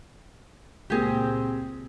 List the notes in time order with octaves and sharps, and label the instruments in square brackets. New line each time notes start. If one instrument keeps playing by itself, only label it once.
[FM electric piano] C#2 A#2 A#6 [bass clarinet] C4 [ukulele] G4 G#4